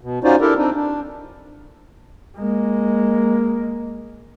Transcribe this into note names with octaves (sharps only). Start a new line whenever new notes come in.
B2
C#4 D#4 F4 F#4 C5 D5
D4 E4 G4 A4 A#4
C4 D4 D#4
D4
G#3 A#3